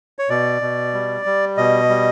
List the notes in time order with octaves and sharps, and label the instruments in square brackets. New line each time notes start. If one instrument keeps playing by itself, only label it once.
[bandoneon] C#5
B2 D5
B2
G3
G3
B2 D#5
G3